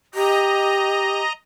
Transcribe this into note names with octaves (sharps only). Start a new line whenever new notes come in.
G4 D#5 A#5